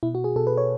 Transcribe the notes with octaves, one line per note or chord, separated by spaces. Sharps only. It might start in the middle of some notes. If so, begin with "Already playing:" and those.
B2 E4
F#4
G#4
B2 A4
B4
C#5